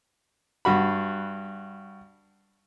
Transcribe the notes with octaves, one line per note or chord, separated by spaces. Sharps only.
G2 F#4 B5